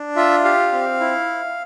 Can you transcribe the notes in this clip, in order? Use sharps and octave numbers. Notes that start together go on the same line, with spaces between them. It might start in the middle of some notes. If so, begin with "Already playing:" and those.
Already playing: D4
F4 E5
G4 F5
C4
E4